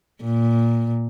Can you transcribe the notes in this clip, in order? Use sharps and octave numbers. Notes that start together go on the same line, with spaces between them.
A#2